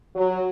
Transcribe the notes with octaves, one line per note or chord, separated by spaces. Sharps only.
F#3